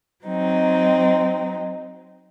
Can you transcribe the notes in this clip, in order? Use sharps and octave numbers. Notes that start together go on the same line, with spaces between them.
F#3 C4 D#4